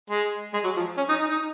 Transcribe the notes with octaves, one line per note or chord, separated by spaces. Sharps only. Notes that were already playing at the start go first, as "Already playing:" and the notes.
G#3
G#3
F#3
F3
C#4
D#4
D#4
D#4